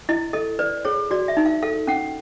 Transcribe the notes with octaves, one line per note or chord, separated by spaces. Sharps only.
E4 D#5
A4 D#5
B4 D5
G#4 C#5
F#4 D5
E5
D#4
F5
A4 F5
C#4 F#5